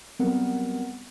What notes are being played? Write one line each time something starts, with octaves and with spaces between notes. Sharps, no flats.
F#3 G3 B3 C4 A#4 F#5